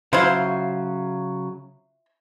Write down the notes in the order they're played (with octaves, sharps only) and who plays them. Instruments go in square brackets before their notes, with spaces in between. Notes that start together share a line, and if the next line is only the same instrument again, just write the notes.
[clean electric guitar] C#3 F#3 [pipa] E4 F4 C5